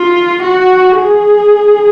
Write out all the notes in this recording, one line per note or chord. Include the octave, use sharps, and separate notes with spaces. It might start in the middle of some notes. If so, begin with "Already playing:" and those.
Already playing: F4
F#4
G#4